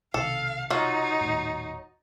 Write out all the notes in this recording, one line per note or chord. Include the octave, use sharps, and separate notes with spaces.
B1 C3 D#3 A4 F5
F#3 D#4 F4
D#1 A2